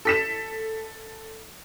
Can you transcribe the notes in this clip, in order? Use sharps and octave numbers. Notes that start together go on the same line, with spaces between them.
A4 B6 E7